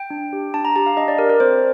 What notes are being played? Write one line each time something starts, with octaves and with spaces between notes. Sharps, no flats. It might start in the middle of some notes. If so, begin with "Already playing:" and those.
Already playing: G5
D4
G4
D4 A5
A#5
G4 A5
F5
D4 D#5
D5
G4 A#4
A#4
C4 C5